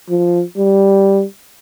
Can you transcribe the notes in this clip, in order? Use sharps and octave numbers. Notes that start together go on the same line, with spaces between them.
F3
G3